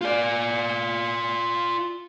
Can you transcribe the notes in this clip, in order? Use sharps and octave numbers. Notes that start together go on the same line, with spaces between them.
F4 D5